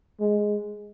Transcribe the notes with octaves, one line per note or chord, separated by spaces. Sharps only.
G#3